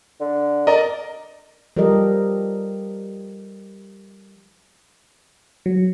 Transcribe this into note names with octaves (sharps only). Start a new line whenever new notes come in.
D3
A#4 D5 D#5
F3 G3 G4 A4 A#4 D#5
F#3